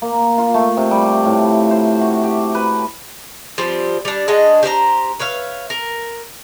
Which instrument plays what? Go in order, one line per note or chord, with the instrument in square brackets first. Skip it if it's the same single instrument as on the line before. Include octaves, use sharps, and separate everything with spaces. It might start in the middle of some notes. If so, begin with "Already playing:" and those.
[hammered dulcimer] A#3
F4
A3
C3
G3
A2
C5
F#4
G4
B4
[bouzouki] F3 G3 C4 G4
G3 D4
G#3 D4 F#4 D#5
G4 C5 D5 A#5
B4 C#5 E5 F5
A#4